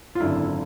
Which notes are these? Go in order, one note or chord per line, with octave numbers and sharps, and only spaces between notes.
F4
G#1 F#2 D3 E4